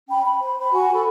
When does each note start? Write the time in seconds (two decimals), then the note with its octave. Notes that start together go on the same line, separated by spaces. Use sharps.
0.09 C#4 G5 B5
0.25 B5
0.41 C5
0.58 C5 B5
0.73 F#4 F#5 G#5 C#6
0.93 A4 B5